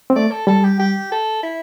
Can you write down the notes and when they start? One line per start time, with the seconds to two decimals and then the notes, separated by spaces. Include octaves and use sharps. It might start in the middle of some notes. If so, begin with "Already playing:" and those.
0.10 C4
0.16 A3 D5
0.31 A4
0.47 G3 A4
0.64 G4
0.79 G4
1.12 A4
1.43 E4